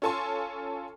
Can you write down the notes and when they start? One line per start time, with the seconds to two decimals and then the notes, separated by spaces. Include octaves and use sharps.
0.02 C#4 F4 A4 G#5 A5 C6